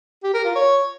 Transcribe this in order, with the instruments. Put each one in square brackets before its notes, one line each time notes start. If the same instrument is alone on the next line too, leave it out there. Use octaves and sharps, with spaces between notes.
[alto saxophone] G4
A#4
F4
C#5